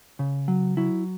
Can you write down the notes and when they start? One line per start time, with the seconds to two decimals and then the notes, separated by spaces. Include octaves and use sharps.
0.19 C#3
0.48 F#3
0.77 F#3 E4